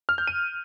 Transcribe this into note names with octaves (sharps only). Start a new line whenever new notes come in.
F6
G6
D#7